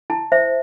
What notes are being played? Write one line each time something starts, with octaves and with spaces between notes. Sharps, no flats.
E4 A5
C5 E5